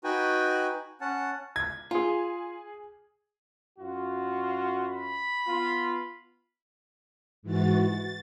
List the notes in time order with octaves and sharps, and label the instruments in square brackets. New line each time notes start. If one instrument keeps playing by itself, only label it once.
[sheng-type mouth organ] D#4 F#4 B4 G5 G#5
C#4 F#5 A5
[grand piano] G#6
[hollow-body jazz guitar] F4 [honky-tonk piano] G#4 G#5
[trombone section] F#2 F4 F#4
[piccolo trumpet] B5
[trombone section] B3 F4
[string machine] G#2 E3 F#4 A6
A6